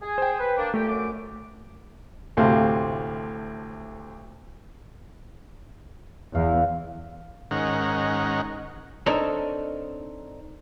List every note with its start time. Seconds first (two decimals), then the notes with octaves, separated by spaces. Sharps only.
0.02 G#4
0.18 C5 G5
0.39 B4
0.57 A#3 D4
0.74 A#2 A3 G4
0.89 F#2 D6
2.37 D2 A2 C3 C5 F5
6.35 E2 F5
7.51 G#2 D#3 C#4 A#4 F#5
9.06 C4 D4 D#4 A4 A#4 C#5